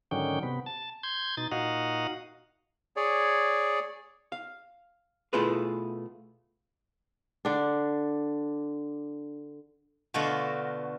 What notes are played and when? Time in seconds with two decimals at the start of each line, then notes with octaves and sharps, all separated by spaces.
0.11 G#2 D3 D#3 F#3 C#4 G5
0.43 C3 B3
0.66 A5
1.03 C6 G6 G#6
1.37 B2 D#4 A6
1.52 A#2 D#4 F#4 D#5 F5 F#5
2.96 G#4 C#5 D5
4.32 F5
5.33 B2 A3 E4 F4 G#4 B4
7.45 D3 D4
10.14 B2 D3 A3 F4 F#4